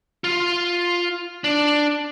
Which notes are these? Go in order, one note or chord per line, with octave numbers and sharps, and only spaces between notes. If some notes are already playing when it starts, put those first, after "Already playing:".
F4
D4